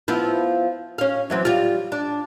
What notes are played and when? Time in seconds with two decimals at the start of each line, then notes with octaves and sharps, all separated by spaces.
0.08 F3 B3 E4
0.98 C#4 F5
1.30 E3 F#3 C4
1.45 G3 F4
1.92 D4